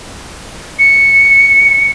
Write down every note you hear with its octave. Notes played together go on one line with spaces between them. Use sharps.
C#7